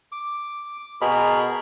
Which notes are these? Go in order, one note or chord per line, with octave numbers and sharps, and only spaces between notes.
D6
B2 G#4 A#4 B5